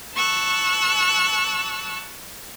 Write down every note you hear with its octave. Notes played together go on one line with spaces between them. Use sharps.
A5 C#6 E6 F#6